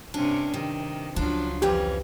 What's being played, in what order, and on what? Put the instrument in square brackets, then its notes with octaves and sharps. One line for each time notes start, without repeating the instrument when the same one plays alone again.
[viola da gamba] G2 C3 C#4 [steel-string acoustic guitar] D4
[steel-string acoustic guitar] C3 [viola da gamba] D#3
[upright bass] C#2 C#3 [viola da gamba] F3 F#3 F4 [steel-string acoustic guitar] D4
[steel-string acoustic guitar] F2 E3 C#4 [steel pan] G4